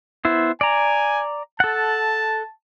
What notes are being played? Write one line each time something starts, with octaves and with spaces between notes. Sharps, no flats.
B3 E4 C5
D5 G#5 A#5
A4 F#5 A5